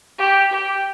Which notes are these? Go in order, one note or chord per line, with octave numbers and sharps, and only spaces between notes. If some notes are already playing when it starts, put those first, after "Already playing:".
G4
G4